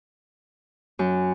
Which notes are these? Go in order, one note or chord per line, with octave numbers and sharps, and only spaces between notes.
F#2